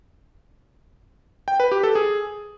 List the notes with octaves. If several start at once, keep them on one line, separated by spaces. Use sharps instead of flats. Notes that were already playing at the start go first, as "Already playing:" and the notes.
G5
B4
G4
A4
G#4